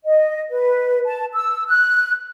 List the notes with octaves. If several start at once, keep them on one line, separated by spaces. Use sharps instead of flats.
D#5
B4
A5
E6
F#6